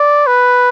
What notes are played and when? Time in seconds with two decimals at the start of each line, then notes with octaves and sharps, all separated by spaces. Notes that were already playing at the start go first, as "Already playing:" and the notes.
Already playing: D5
0.27 B4